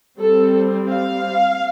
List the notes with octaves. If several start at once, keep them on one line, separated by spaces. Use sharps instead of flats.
G3 C4 A4
F5